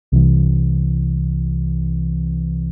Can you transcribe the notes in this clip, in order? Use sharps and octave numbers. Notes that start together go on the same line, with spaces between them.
C2 C3 E3